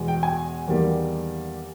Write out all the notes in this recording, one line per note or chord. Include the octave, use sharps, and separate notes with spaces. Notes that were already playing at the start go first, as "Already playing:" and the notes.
Already playing: E2 B2 G#3
G5
G#5
E2 D#3 G3 A#3